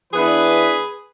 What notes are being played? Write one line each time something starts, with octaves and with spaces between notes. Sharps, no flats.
E3 B3 D4 G#4 B4